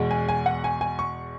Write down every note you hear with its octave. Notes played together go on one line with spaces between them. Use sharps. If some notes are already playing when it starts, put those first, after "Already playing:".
Already playing: E2 B2 G#3
G#5
G#5
F#5
G#5
G#5
C#6